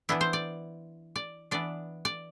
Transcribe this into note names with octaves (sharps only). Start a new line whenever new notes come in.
E3 B3 D4 E4
C5
D5
D5
E3 B3 D4 D5
D5